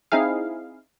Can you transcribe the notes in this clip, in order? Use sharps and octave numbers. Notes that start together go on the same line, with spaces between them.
C4 D#4 E4 G#4 F5